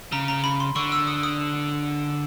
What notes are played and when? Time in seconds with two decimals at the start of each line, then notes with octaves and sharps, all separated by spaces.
0.12 C#3 A#5
0.28 A#5
0.44 B5
0.60 C6
0.76 D3 C#6
0.92 E6
1.07 D#6
1.23 D#6